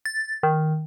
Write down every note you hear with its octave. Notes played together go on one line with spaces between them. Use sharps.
A6
D#3